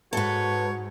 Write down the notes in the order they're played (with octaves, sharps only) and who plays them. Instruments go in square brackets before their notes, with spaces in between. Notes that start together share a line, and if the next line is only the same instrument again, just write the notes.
[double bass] G#2 [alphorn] F#4 [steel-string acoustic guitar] A4 B4 [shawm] C#5